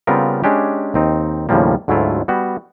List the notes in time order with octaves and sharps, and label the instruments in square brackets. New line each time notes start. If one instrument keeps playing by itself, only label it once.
[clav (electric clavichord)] C#3 G3 B3 C4 F4 A#4
G#3 C#4 D4 G4
D#2 C4 D#4
D#2 A2 C#3 F3 G3 A#3
D2 G#2 F#3 A3 E4 F4
G3 B3 F#4